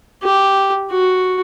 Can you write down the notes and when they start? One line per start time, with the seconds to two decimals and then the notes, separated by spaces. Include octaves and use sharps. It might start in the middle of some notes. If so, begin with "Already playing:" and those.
0.23 G4
0.91 F#4